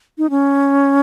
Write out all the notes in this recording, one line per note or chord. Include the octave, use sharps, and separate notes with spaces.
D#4
C#4